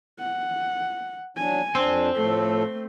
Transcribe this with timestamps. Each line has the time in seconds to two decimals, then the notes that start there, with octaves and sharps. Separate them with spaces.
0.20 F#5
1.37 F#3 D4 G#5
1.75 F2 C4 D4
2.16 A2 F3 A3 A4